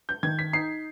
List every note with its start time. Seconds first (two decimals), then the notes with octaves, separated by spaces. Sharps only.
0.09 G6
0.23 D#3 G#6
0.39 B6
0.53 D#4 C7